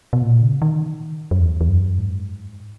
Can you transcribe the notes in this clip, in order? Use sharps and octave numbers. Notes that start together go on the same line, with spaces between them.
B2
A#2
C#3
D#3
F#2
E2
E2
F#2
G#2